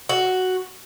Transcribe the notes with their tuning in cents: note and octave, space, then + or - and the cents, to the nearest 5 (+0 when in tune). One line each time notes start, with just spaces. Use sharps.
F#4 +5